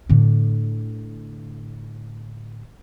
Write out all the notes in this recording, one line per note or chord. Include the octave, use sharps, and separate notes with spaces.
A2 D3